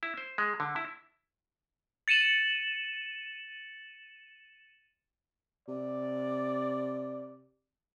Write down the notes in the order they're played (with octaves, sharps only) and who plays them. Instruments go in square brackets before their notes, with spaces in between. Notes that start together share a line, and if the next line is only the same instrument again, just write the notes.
[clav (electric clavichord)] E4
C5
G#3
D3
E4
[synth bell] A6 C#7 D#7 E7 F#7
[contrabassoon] C3 [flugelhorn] D5